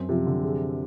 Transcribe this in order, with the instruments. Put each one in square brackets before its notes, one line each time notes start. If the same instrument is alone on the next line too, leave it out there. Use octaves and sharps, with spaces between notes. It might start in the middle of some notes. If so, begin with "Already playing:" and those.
Already playing: [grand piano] F#2 [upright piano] C4
[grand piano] C3 [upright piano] F3
[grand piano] D3
[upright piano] G#4